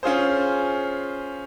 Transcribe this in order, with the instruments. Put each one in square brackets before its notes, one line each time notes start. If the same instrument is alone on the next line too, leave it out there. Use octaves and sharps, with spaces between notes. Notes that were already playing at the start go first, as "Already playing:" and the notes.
[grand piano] C#4 F4 G#4 C5